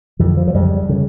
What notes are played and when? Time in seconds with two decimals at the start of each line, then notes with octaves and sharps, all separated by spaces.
0.19 F2 D3 E3
0.37 F3
0.47 F3
0.54 F2 C#3 G3
0.89 C#3